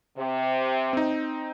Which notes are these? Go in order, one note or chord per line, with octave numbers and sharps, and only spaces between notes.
C3
C4 D#4